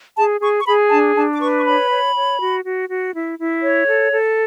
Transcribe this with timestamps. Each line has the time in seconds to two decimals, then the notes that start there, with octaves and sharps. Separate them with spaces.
0.17 G#4 A5
0.41 G#4 C#6
0.62 C#6
0.66 G#4 B5
0.90 D4 A5
1.15 D4 A5
1.33 D6
1.40 B4 C#6
1.58 C#6
1.65 C#5 B5
1.90 C#5
2.14 C#5
2.39 F#4
2.63 F#4
2.88 F#4
3.13 E4
3.38 E4
3.63 C#5
3.87 A4
4.11 A4